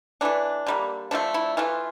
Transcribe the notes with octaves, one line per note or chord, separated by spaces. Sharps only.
E3 A3 D4
D3 G3 A#3
D3 F3 A3 D4
E4
E3 A3 F4